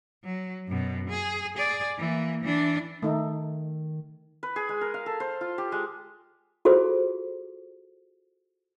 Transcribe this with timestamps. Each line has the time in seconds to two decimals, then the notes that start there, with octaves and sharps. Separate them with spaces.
0.24 F#3
0.68 F#2 B2
1.10 G#4
1.57 G#4 D5
1.98 E3 A#3
2.44 E3 D4
3.03 D#3 A3 D#4
4.43 B4
4.56 G#4
4.69 G#3
4.81 A#4
4.94 F5
5.06 A4
5.20 C5
5.41 F4
5.58 G4
5.72 G#3
6.65 F4 F#4 G#4 A4 C5